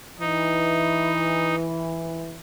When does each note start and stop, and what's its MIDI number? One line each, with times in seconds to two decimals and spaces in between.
0.20 2.38 52
0.20 1.55 63